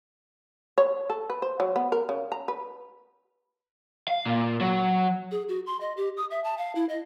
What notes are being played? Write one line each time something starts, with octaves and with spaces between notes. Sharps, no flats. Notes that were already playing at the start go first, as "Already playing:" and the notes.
C#5
A4
B4
C5
F#3
B3
A#4
C#3
A#5
B4
F5
A#2
F#3
G#4
F#4
C6
D#5
G4
D#6
E5
A5
F5
E4
D#5